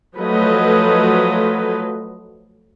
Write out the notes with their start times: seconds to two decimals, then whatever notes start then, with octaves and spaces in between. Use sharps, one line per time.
0.16 F3 F#3 A3 B4 D#5